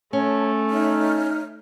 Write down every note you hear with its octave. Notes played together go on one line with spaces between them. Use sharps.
A3 C#4 C#5 A5
D#4 C#5 E5 F6